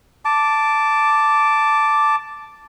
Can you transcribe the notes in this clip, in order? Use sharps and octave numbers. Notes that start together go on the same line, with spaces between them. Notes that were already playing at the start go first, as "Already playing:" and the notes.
A5 D6